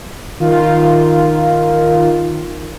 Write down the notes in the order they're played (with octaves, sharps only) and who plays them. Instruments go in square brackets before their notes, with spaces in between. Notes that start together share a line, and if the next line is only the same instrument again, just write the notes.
[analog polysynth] D#3 F4